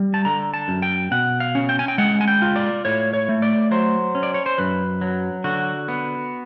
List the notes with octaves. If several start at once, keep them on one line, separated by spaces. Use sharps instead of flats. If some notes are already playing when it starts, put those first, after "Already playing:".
Already playing: G3
A5
D3 A#5
A5
F#2
G5
B2 F#5
F5
C#4
G5
G#5
G5
G#3 F#5
G#5
G5
F4
D5
A2 C#5
C#5
A3
D5
F#3 C5
C#4
D5
C#5
C5
F#2 B4
F#3
D3 F#4
B3